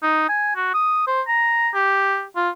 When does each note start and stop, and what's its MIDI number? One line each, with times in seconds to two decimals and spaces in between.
0.03 0.24 63
0.29 0.51 80
0.56 0.72 66
0.74 1.04 87
1.07 1.22 72
1.28 1.69 82
1.74 2.24 67
2.36 2.50 65